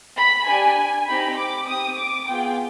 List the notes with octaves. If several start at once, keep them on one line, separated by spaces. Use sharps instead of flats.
B5
D4 G4 G#5
C4 D#4 G4 B5
D6
C4 G4 D#6
D6
B3 F4 G#4 G5